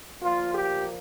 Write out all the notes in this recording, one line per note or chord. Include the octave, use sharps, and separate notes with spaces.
A#2 F3 A#3 F4
G4